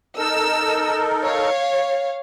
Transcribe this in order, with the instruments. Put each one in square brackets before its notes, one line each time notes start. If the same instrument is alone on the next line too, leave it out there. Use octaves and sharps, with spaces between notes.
[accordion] D#4 A4 A#4 [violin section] E6
[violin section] C#5 F5